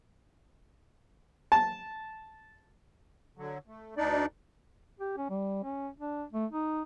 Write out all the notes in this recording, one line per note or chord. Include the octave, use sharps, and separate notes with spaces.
A5
D3 F#3
A3
D2 D4 D#4 D5
G4
C#4
G3
C#4
D4
A3
D#4